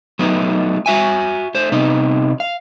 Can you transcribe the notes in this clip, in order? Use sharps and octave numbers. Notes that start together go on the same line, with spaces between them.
F#3 A3 B3 D#4
F#4 E5 G#5
A3 C5
C3 B3 D#4
F5